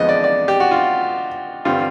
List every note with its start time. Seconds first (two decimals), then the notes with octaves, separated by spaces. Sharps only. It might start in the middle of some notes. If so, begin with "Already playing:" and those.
Already playing: F2 D3 F3 G#3 B3 D#5
0.09 D5
0.24 D5
0.48 G4
0.60 F#4
0.71 F4
1.65 G2 D3 G3 C4 F4